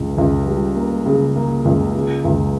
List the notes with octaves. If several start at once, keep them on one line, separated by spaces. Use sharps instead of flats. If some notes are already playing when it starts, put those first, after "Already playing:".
Already playing: C#2 C#3
C#2
G3
A#3
C#3
A#3
C#2
C#3
C#2